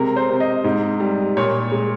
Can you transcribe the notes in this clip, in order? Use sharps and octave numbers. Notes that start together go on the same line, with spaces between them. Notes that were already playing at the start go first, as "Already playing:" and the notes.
Already playing: C3 G#3 A#4
C5
C3
D#5
G#2
G3
A#2 C#5
G#3